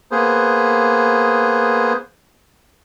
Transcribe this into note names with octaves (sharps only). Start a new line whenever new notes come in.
A#3 B3 G#4 C5